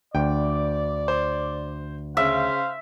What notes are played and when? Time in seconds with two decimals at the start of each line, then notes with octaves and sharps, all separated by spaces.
0.15 D2 D5 G5
1.08 C5
2.17 C#3 C5 E5 F5